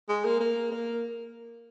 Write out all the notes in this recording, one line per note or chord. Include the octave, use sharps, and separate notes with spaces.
G#3
A#3
A#3
A#3